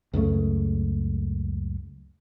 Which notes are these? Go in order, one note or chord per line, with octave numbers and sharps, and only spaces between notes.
C#2 F#2 C#3 A3